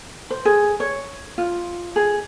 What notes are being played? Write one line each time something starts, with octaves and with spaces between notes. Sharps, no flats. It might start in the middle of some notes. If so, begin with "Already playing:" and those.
C5
G#4
C#5
F4
G#4